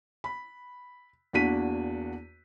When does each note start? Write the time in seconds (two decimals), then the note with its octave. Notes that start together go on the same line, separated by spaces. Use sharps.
0.24 B5
1.33 E2 A#3 D4 F#4 B6 D#7